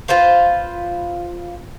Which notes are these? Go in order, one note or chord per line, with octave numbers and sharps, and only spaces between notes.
F4 B4 C5 F5